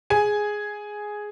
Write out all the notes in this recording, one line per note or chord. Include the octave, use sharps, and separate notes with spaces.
G#4 G#5